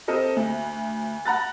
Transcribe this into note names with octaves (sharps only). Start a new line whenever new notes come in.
C4 G4 A4 A#4 D#5
D2
F#5 A#5 F#6 A6